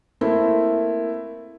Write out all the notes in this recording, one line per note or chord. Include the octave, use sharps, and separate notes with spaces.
A3 A#3 C4 E4